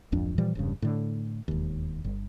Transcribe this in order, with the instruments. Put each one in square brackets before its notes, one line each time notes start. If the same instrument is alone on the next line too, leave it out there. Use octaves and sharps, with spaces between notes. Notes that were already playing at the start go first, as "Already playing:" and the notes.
[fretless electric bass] D1 G#1 F2 D4
A#2 E3 F3 G3
E1 G2 C#3
A2 D3
E1 D#2
G1